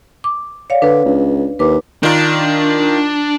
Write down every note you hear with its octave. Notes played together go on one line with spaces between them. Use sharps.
D6
C#5 D5 F5
D3 D4 B4
C#2
D#2 B4 D6
D#3 D4 F4 A#4